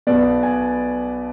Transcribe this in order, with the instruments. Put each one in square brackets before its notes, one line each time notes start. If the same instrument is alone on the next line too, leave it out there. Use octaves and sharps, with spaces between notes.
[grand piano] B1 B2 B3 D5
G#5